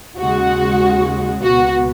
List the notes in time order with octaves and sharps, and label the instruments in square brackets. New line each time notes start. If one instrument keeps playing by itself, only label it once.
[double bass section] D#2 C#3 G#3 [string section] F#4
[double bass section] C#2 B2 B3 [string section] F#4